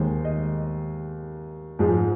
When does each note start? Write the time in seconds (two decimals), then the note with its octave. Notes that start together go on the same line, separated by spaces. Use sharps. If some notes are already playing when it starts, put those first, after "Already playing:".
Already playing: D#2 D#3 G#3 C5
0.25 D#5
1.79 G#2 F3 G#3